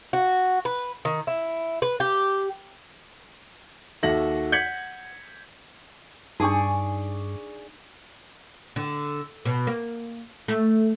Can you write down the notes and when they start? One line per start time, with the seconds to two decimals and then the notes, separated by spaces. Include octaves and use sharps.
0.13 F#4
0.65 B4
1.05 D#3
1.27 E4
1.82 B4
2.00 G4
4.03 D#2 F#4 A4 E5 A#6 F#7
4.52 F#5 G6 G#6 B6 C#7 F#7
6.40 G2 D4 D#4 G#4 D5 C#6
8.76 D3
9.45 B2
9.67 A#3
10.48 A3